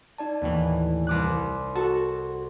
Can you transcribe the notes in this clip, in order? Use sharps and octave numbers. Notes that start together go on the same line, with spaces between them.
D#4 D5 A5
D#2 A2 E3
C2 D6 F#6
F#4 A4